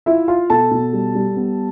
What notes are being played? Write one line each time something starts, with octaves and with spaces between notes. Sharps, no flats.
E4 F4 E5
F4 F5
B2 A4 A5
B2
G3
G3
B3